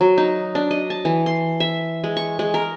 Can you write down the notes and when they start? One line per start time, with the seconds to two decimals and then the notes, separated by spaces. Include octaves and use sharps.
0.01 F#3
0.18 D#4
0.55 D4
0.71 D#5
0.90 A5
1.05 E3
1.26 C6
1.60 E5
2.04 G#3
2.17 C#6
2.39 G#3
2.54 A#4